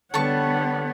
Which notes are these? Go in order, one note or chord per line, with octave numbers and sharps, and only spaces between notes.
D3 G3 B3 A4 C#5 F#5 A5 C#6